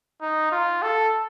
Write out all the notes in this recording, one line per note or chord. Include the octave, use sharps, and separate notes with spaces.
D#4
F4
A4